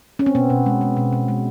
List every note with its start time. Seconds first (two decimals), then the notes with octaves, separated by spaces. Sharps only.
0.19 C#4
0.26 C4
0.35 B2 B3
0.50 B2
0.66 G#3
0.81 G#3
0.97 B2
1.13 B2
1.28 G#3